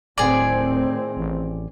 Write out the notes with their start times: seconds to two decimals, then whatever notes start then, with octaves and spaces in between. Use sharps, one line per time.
0.18 D1 A2 D#3 C4 G#4 D5
1.17 A1